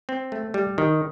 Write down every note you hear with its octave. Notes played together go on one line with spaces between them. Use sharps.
C4
A3
G3
D#3